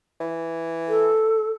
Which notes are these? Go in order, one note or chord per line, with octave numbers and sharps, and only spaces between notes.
E3
A4